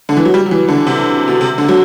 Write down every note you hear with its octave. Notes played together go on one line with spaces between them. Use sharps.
D3
E3
F#3
G3
F#3
E3
D3
C3
B2
C3
D3
F#3